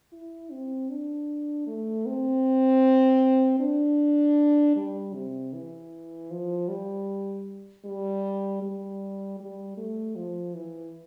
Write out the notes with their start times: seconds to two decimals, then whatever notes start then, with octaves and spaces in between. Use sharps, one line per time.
0.13 E4
0.52 C4
0.90 D4
1.67 A3
2.06 C4
3.60 D4
4.76 G3
5.14 C3
5.53 E3
6.31 F3
6.68 G3
7.85 G3
8.62 G3
9.40 G3
9.77 A3
10.16 F3
10.54 E3